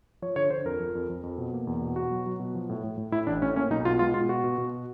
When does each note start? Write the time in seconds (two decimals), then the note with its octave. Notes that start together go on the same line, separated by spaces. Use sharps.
0.22 F3 C#5
0.36 D3 C#5
0.50 D3 C5
0.65 F2 A#4
0.80 F3
0.95 F2
1.10 F2
1.23 F2
1.38 B2
1.53 A#3
1.67 E2
1.82 B2
1.96 B2 F#4
2.11 F#3
2.26 F#3
2.40 B2
2.55 F3
2.69 A2
2.84 A2
2.97 A2
3.12 A2 E4
3.27 A1 D4
3.42 A2 C#4
3.56 A#3 C#4
3.70 B1 D#4
3.85 B2 F4
3.99 G#3 F4
4.14 B2 F4
4.29 B2 F#4
4.44 B2
4.58 B2